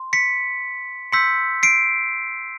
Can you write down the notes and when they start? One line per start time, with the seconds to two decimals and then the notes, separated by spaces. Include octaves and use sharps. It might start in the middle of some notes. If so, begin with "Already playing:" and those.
Already playing: C6
0.13 B6 C#7
1.12 C6 E6 G6 B6 C#7
1.63 C7 D7